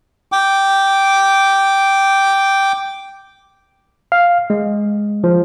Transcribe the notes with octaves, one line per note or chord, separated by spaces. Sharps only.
G5 D6
F5
G#3
F3